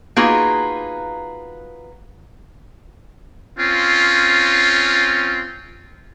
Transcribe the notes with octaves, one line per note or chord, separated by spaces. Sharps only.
A#3 B3 D#4 F4 F#4 G#4
C4 C#4 F4